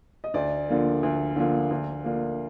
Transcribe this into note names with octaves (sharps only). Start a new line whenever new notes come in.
D#5
D2 D5
D3 F3 A#3
D2
D3 F3 A#3
D2
D3 F3 A#3